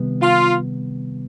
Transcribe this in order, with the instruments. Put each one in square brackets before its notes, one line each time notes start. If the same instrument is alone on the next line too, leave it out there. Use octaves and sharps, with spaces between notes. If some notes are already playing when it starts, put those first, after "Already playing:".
Already playing: [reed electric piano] C3 D#3 G3 B3
[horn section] F4